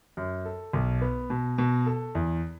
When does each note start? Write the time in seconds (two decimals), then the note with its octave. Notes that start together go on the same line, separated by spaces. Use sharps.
0.17 F#2
0.45 A4
0.73 B1
1.01 B3
1.30 B2
1.58 B2
1.86 A4
2.15 E2